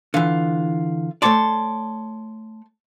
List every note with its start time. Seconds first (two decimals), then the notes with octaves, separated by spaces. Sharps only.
0.14 D3 E3 F4
1.22 A3 C#5 D5 A5 C6